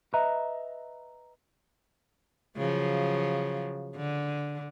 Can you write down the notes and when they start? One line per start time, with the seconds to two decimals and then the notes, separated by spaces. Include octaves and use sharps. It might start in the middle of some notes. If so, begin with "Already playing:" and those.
0.14 B4 D#5 E5 A#5
2.57 C#3 F3 F#3
3.96 D3